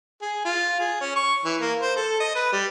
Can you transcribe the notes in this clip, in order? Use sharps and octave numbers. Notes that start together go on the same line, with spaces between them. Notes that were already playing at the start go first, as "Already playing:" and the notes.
G#4
F4
G#4
C#4
C#6
E3
A#3
C5
A4
D#5
B4
G3